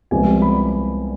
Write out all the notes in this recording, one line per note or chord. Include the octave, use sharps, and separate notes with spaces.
C2 C3 F3 G#3 B3 G#5
B5